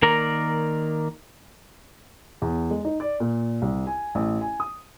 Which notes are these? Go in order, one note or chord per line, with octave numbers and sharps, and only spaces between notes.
D#3 A#3 A#4 D5 A#5
E2
G#3
D#4
D5
A#2
C2
G#5
A1
G#5
D#6